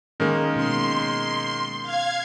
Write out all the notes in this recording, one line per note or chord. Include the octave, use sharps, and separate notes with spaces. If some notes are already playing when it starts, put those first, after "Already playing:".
D#3 G#3 A#3 C#4 G#4 A#4
B2 C#4 C6
F5 G#6